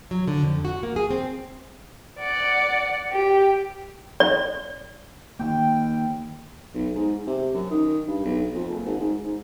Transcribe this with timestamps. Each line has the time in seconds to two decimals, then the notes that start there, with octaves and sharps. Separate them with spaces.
0.11 F#3
0.28 D3
0.44 F2
0.65 F#4
0.83 A#3
0.96 G#4
1.11 C4
2.19 D5 F#5
3.11 G4
4.20 D5
5.39 D#3 A#3 G5
6.74 B1
6.95 G#2
7.27 C3
7.54 F#2
7.70 D#3
8.07 G2
8.25 B1
8.54 F2
8.70 F#1
8.86 G#1
8.99 G#2
9.24 G#2